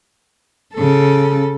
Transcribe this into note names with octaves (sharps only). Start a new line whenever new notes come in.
C#3 A4